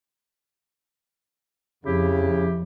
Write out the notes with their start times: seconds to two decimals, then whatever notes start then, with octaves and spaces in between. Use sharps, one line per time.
1.86 F2 C#3 E4 G4